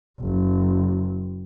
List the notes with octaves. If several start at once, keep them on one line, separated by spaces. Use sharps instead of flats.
F#1